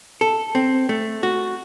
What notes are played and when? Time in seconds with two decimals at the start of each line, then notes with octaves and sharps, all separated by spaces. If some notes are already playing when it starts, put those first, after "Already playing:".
0.21 A4
0.55 C4
0.89 A3
1.23 F#4